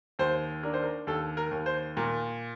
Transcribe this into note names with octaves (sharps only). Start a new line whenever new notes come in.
D#2 C5
D4 A#4
C5
A#4
D#2 A4
A#4
D#2
C5
A#2 A#4